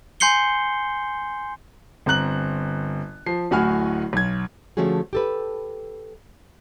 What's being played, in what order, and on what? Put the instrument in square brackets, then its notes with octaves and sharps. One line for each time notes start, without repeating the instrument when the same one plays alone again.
[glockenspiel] G#5 C6 G6 C7 C#7 G7
[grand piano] G1 C4 A#5 F#6 F#7
F3 C7
D1 A2 F#4 G#5 F6
B1 G#6
[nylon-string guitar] D3 F3 A3 C#4 F#4 G#4
G4 A4 B4